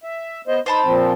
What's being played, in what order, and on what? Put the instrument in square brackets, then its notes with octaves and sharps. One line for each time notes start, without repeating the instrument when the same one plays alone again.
[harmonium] E5
B3 C5 D#5
[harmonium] D#4 [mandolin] C5 A5 B5
[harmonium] A#2 F3 C4